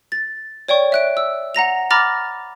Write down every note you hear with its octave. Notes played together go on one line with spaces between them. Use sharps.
A6
C#5 D5 G5 C#6
E5 F#6 D7
E6
F#5 A#5 A#6 F7
A#5 B5 D6 F6 A6 A#6